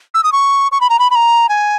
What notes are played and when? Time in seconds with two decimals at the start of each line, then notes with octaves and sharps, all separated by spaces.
0.14 E6
0.23 D#6
0.32 C#6
0.72 C#6
0.81 B5
0.90 A#5
0.99 B5
1.10 B5
1.15 A#5
1.49 G#5